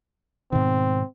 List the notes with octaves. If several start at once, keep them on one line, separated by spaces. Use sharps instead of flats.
G#2 B2 D#3 C4